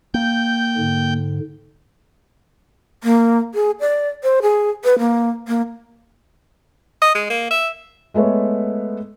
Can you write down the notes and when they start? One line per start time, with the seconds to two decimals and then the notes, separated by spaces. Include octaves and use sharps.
0.14 A#3 G5 G6
0.77 G#2 D3
3.04 A#3
3.54 G#4
3.80 D5
4.23 C5
4.42 G#4
4.84 B4
4.99 A#3
5.48 A#3
7.02 D#5
7.15 G#3
7.30 A#3
7.51 E5
8.14 G#3 A3 B3 C#5